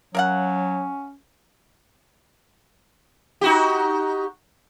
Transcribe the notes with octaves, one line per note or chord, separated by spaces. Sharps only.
F#3 C#4 A#4 F5 F#5
D#4 F#4 G4